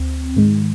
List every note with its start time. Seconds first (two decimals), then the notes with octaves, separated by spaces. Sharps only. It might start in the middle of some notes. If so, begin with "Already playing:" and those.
Already playing: D2 C4
0.37 G#2 D#3 G#3